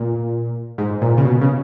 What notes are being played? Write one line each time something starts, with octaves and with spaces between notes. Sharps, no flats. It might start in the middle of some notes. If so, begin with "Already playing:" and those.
Already playing: A#2
G#2
A#2
C#3
B2
C#3